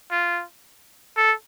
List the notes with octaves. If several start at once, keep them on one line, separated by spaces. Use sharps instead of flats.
F4
A4